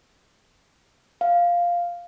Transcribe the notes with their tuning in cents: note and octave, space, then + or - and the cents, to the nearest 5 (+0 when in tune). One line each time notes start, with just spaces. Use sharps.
F5 +0